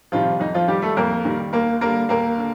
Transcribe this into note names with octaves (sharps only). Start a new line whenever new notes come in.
C3 D#3 F3 G3 F4
F2 D#4
F3 F4
D#3 G3 G4
A3 A4
F2 A#3 A#4
D#3 G3
D#2 A#3 A#4
D3 G3 A#3 A#4
D#2 A#3 A#4
D3